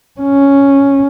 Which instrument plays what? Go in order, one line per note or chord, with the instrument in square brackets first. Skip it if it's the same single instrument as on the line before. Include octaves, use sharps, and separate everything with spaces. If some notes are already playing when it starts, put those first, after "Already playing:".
[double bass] C#4